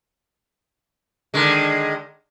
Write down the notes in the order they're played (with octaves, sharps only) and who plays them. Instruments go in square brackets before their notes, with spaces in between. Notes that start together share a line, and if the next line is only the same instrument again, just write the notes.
[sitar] D3 D#3 G#3